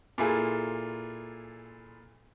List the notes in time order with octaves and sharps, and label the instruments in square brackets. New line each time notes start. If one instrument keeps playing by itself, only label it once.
[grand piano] A#2 E4 F4 G#4 A4